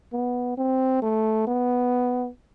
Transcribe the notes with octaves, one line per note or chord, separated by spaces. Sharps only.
B3
C4
A3
B3